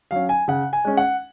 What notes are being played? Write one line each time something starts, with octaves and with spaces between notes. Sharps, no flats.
F#3 C#4 F5
G#5
C#3 F#5
G#5
G#3 C#4
F#5